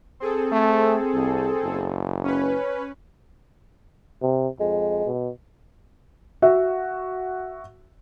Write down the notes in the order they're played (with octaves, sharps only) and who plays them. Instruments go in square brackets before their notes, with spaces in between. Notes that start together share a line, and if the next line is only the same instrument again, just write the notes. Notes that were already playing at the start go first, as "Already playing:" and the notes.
[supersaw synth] C4 G#4 A4
[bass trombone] A3
C2
F#1
[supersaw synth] C#4 B4
[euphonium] C3
[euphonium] F2 [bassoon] G#3
[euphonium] B2
[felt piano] F#4 E5